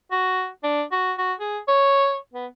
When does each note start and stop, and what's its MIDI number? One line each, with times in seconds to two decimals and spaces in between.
0.12 0.48 66
0.64 0.83 62
0.92 1.13 66
1.18 1.33 66
1.40 1.58 68
1.68 2.17 73
2.34 2.46 59